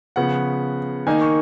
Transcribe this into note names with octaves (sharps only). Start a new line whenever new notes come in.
C#3 F3 B3 F#5
D#3 A#3 D#4 G#5
C#6